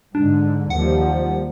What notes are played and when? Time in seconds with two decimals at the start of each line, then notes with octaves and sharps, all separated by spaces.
0.15 G#2 D3 D4
0.70 D#2 F3 G3 F#5